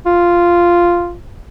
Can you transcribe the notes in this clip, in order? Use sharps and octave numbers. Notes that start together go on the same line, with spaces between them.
F4